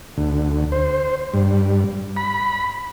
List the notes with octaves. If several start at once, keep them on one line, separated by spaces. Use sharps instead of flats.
D2
C5
G2
B5